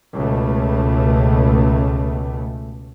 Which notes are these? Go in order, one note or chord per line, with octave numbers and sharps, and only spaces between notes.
C#2 B2 A3